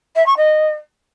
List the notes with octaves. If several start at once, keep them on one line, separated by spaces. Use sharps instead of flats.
E5
C#6
D#5